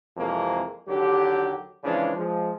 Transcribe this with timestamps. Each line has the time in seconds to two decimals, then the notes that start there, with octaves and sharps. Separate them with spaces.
0.17 F2 C3 E3 G#3 A#3
0.88 D#2 D3 F#3 G4
1.84 C#3 E3 F3 G#3 D4
2.16 F3 G#3